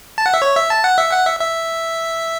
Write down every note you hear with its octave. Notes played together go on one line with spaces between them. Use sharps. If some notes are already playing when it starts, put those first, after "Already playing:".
A5
F#5
E5
C#5
E5
A5
F#5
E5
F#5
E5
E5